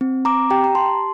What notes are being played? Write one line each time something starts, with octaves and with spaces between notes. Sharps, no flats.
C4
C4 A#5 D6
G4 G5 A#5
A#5
G4 A5 C6